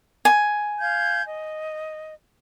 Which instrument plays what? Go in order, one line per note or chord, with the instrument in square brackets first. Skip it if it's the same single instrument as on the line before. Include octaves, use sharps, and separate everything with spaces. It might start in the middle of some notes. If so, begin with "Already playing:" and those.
[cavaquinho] G#5
[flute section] F5 G6 G#6
D#5